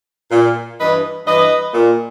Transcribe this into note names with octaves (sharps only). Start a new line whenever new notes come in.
A#2
G2 E3 B4 D#5
G2 E3 B4 D#5
A#2